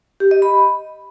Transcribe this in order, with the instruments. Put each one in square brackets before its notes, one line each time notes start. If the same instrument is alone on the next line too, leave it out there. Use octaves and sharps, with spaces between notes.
[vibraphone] G4
D#5
B5